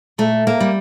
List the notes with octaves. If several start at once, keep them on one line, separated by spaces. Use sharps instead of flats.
A#2 A3
A#3
G3